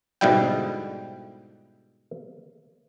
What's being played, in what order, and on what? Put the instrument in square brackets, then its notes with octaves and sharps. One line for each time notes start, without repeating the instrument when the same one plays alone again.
[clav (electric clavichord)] G#2 B2 D3 G3 E4 G5